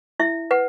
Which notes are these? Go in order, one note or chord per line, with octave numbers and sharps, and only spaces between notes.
E4 E5
B4 F#5